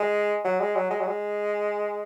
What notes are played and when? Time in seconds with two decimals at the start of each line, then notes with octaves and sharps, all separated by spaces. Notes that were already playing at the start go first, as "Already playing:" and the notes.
Already playing: G#3
0.44 F#3
0.60 G#3
0.75 F#3
0.90 G#3
1.00 F#3
1.07 G#3